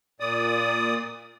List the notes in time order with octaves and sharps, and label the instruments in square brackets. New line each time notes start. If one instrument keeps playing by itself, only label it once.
[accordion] A#2 D5 D#6